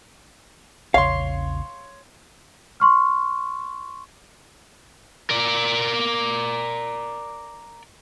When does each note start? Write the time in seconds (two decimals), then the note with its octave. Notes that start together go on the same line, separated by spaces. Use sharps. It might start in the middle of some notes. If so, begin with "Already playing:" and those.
0.94 A#1 E2 C#3 C#5 F5 C6
2.80 C6 C#6 F6
5.30 A#4 D5